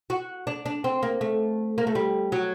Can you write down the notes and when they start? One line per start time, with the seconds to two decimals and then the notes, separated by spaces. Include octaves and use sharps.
0.10 F#4
0.47 D4
0.66 D4
0.84 C4
1.03 A#3
1.21 A3
1.78 A#3
1.87 A3
1.95 G3
2.32 F#3